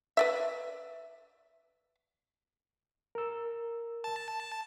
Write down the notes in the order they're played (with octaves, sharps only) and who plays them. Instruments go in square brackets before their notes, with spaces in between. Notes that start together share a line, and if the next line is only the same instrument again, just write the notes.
[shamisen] B4 D5 E5
[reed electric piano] A#4 E6
[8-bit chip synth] A5